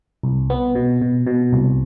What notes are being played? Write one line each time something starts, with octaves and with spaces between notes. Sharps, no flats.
C2
B3
B2
B2
B2
C2